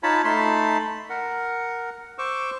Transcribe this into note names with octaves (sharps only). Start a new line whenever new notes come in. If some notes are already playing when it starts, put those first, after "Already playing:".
D#4 F4 C#5 A5 B5
A3 D#4 A5 B5 C6
A#4 F#5
C5 C#6 D6 E6